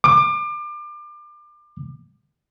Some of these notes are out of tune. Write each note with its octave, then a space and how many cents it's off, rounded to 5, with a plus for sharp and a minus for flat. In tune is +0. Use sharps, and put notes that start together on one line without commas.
D6 +30